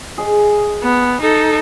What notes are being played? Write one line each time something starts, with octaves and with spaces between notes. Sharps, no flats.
G#4 D#5
B3
D#4 A4